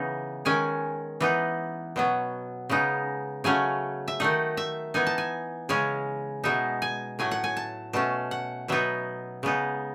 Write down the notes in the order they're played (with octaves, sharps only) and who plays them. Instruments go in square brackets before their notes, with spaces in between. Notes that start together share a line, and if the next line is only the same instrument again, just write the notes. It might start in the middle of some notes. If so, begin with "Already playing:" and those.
Already playing: [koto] C#3 E3 B3 D#4
D#3 G#3 C#4 G#5
E3 B3 D#4
B2 F#3 B3
C#3 G#3 B3 D#4
C#3 F#3 A3 C#4 G#5
E5
D#3 A3 D#4 F#5
E5
E3 B3 D#4 G#5
A5
G#5
C#3 G#3 C#4 G#5
B2 G#3 B3 D#4 E5
G#5
A2 F#3 A3 G#5
F#5
G#5
A5
B2 A3 C#4 A5
F#5
B2 F#3 B3 D#4 E5
C#3 G#3 B3 D#4